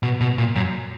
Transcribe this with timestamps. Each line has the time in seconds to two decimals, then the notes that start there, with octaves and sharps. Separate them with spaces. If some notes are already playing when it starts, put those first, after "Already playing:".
0.03 B2
0.21 B2
0.38 A#2
0.56 F#2